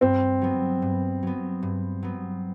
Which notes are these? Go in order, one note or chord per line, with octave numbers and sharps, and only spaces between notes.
G2 C4
F#3 B3
G2
F#3 B3
G2
F#3 B3